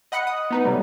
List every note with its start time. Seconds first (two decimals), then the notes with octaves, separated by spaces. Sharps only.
0.12 D#5 F#5 B5 F#6 C#7
0.27 D#6
0.51 B3 D#4 B4
0.64 C3 F#3 G3 A3